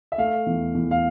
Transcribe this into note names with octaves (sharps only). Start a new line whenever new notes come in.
E5
A3 F5
E2
E2
F5